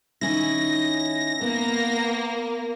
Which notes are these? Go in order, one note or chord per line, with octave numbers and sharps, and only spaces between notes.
D#3 C#4 E4 A#6
A#3 B3